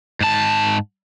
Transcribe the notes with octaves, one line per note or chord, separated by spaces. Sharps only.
G#2 A5